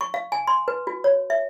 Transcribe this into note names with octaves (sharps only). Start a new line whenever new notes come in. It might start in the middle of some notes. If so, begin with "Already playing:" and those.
C#6
F5
G#5
C6
B4
F#4
C#5
E5